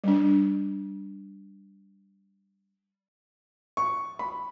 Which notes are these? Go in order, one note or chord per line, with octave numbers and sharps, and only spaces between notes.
G3 D4
C#6
B5